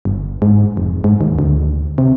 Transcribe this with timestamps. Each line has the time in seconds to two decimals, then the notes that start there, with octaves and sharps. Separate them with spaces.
0.05 G1
0.42 G#2
0.77 F1
1.04 G#2
1.21 D#2
1.39 D2
1.98 C3